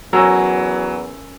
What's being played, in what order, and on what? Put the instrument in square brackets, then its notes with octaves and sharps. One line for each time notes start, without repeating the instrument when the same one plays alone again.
[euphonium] E2 [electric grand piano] F#3 A#5 E6 [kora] C#4 A#4